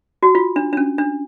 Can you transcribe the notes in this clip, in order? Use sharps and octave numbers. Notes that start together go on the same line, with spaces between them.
F#4
F4
D4
D4
C#4
D4